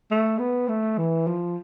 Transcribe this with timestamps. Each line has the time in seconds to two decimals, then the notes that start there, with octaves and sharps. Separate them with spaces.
0.11 A3
0.39 B3
0.68 A3
0.98 E3
1.27 F3